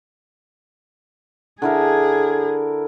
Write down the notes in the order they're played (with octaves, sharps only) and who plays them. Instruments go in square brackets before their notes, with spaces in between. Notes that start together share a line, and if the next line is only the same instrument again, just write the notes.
[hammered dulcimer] D3 E4 A#4 [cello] G#4